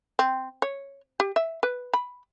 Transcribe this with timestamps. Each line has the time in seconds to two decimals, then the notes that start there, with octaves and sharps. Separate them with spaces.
0.19 C4
0.62 C#5
1.20 G4
1.36 E5
1.63 B4
1.93 B5